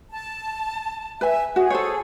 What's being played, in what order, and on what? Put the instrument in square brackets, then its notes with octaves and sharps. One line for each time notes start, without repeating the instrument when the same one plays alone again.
[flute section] A5
[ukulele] B4 G#5 [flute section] E5
[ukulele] F#4 [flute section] G#4
[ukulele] A4 C5 C#5